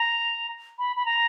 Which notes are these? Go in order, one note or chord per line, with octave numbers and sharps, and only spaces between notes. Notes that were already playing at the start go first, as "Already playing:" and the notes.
Already playing: A#5
B5
B5
A#5